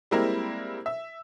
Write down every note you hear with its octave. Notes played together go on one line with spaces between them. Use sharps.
G3 G#3 A#3 C4 E4 A#4
E5